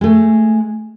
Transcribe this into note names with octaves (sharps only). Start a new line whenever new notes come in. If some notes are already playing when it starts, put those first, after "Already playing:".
G#3 A3